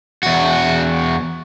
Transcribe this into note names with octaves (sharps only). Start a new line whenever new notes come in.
E2 F#4